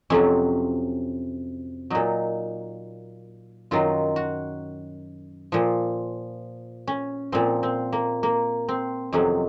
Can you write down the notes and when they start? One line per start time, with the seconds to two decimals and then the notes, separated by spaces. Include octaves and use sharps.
0.10 F2 C3 F#3 C#4
1.90 A#2 F#3 D#4
3.71 F#2 D#3 F#3 F4
4.16 F#4
5.52 A#2 F3
6.87 C#4
7.32 A#2 F3 C4
7.63 C4
7.93 A#3
8.23 A#3
8.68 C4
9.13 F2 C3 D#3 F#3 C#4